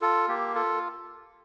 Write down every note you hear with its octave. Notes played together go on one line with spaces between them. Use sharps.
F4 A4
A#3 G4
F4 A4